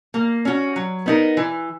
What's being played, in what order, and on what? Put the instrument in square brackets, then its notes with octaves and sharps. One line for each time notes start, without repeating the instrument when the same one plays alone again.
[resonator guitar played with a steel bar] A#3
C#4 F#4
F#3
B3 D#4 A#4
E3